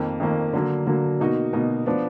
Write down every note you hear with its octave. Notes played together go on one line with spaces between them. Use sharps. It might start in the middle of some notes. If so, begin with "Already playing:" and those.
Already playing: F2 D#3 A#3
F2 D#3 A#3
D3 F#3 A#3
D3 F#3 A#3
B2 A#3 D#4 F#4
B2 A#3 D#4 F#4
F3 B3 D4